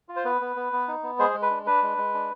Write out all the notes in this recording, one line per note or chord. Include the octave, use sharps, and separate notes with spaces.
F4
C5
B3 B4
B3
B3
B3
D#4
B3
G#3 G#4 C5
G#3
B4
D4
D4 B4
G#3
G#3
D4